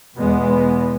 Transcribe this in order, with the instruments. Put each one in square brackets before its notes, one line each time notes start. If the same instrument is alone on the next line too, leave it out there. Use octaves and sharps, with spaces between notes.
[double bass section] E2 B2 G#3 B3